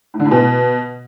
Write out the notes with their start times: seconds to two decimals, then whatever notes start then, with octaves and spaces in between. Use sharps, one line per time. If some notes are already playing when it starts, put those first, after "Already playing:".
0.14 A2
0.20 D3
0.25 A2
0.31 B2